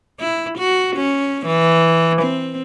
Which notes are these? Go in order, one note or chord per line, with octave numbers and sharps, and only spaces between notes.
E4
F#4
C#4
E3
C4